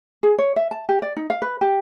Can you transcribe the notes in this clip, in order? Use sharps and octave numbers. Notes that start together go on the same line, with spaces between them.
G#4
C#5
E5
A5
G4
D5
D#4
F5
B4
G4